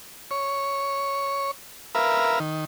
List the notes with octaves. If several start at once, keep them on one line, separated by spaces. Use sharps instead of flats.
C#5
A#4 B4 E5 F5
D#3